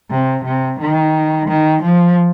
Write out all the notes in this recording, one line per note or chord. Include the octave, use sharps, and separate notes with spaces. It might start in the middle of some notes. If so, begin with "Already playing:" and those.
C3
C3
D#3
D#3
F3